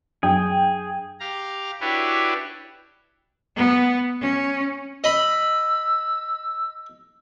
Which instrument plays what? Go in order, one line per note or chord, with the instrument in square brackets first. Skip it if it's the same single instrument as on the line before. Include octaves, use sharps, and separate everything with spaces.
[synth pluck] F#2 F#3 D4 [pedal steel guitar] G#4 [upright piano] G5
[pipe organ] G4 F5 A#5
D4 E4 F#4 G4 B4 C#5
[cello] B3
C#4
[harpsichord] D#5 B5 [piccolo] E6